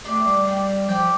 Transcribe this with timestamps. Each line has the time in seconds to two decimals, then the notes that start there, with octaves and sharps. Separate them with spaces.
0.05 A3 D4 G4 D5
0.26 G3
0.47 D4 G4 D5
0.89 F3 G4 D5 G5